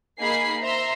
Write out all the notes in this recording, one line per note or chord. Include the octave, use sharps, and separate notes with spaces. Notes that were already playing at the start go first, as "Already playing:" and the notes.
A#3 D#4 G#4 G#5 B5 C7
C5 E5 A#5 C6